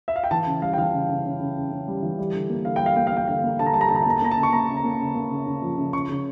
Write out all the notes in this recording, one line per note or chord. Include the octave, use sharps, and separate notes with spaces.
E5
F5
G5
E3 A5
C#3
G3 F5
G5
E3 F5
C#3
C#3
C#3
C#3
C#3
C#3
G3
E3
G3
D3
A#3
D3 F5
G5
G3 F5
A#3 G5
F5
A#3 G5
D3 F5
A#3
D3 A5
A#5
G3 A5
A#5
D3 A5
A#5
A5
A#3 A#5
A5
A#3 A#5
A5
C#3
C#6
A#3 A#5
C#3
A#5
A#3
C#3
A#3
C#3
C#3
F3
C#3
C#3 C#6
C#3